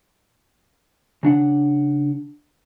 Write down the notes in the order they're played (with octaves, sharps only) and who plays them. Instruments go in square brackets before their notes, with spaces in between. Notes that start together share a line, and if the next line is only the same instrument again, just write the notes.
[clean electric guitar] C#3 D4 F#5